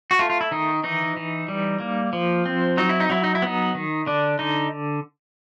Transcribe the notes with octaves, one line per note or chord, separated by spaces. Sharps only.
F#4
A3 F4
F4
E4
D#3 D#4
E3 D#4
E3
G3
A#3
F3
C4
F#3 D#4
E4
D#4
F#3 E4
D#4
E4
B3 D#4
D#3
D3 D4
D3 D#4